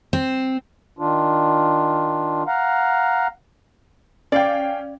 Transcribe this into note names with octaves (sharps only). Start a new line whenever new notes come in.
C4
D#3 D4 F4
F5 F#5 A#5
C#4 D5 F5 G5